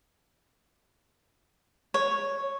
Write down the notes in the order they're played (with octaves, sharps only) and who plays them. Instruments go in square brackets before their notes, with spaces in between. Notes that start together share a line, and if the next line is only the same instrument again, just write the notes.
[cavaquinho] C#5